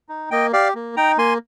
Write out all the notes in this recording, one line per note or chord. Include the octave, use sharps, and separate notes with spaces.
D#4
A#3 D#5 G5
G4 D5 F5
A#3
D#4 G5 A#5
A#3 G#5 C6